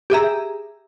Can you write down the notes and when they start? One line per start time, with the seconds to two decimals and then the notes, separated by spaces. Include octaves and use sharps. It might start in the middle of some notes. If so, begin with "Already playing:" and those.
0.10 G4 G#4 E5 A#5